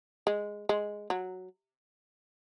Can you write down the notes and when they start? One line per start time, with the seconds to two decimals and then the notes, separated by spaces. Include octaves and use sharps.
0.27 G#3
0.69 G#3
1.10 F#3